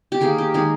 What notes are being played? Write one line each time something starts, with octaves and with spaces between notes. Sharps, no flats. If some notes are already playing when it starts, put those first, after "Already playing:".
G4
D#3 A#3 G#4
G4
D#3 G#3 G#4